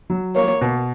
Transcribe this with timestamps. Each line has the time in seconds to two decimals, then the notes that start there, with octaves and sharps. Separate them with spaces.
0.10 F#3
0.36 A#3 C#5
0.61 B2